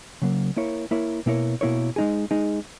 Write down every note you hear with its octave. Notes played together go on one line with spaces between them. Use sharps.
C#3 F#3 A#3
A#3 E4 A#4 C#5
A#3 E4 A#4 C#5
B2 A#3 E4 A#4 C#5
B2 A#3 E4 A#4 C#5
G#3 D#4 G#4
G#3 D#4 G#4